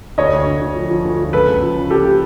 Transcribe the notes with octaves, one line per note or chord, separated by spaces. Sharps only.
D2 C#5 D#5
D2
D2
D2
F3
F3
D2
F3
C#2 A4 B4
C#2
F3
C#3
F3 G4 A4